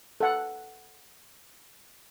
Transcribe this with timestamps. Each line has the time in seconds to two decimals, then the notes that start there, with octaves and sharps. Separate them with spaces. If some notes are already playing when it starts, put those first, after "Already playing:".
0.20 A4 F#5